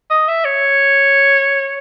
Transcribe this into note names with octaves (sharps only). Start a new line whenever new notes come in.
D#5
E5
C#5